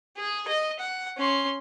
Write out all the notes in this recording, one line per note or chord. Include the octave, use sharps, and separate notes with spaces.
G#4
D#5
F#5
C#4 C6